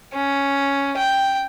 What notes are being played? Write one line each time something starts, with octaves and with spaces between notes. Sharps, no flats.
C#4
G5